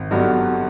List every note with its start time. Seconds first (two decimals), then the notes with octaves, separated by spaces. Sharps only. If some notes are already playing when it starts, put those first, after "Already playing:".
Already playing: G#1
0.11 G2 D3 F#3 B3